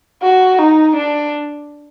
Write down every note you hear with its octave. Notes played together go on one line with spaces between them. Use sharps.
F#4
D#4
D4